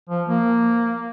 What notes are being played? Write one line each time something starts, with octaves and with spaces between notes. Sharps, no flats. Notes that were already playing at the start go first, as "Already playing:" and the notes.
F3
A#3